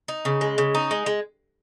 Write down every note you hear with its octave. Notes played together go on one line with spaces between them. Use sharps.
D#4
C#3
G#3
C#3
D#4
G#3
G#3